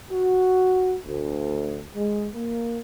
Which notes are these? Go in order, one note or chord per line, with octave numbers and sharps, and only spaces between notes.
F#4
D2
G#3
A#3